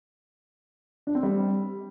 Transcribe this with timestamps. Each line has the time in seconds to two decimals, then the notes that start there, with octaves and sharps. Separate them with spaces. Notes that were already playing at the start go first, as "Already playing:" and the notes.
1.07 D4
1.15 C4
1.23 G3